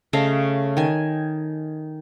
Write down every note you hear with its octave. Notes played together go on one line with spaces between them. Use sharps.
C#3 A3 D#5 F5
D#3 G#5